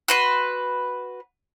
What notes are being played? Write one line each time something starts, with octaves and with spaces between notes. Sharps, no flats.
F#4 B4 C6